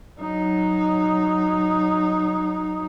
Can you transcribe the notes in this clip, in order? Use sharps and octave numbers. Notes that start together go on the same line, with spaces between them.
F#3 D#4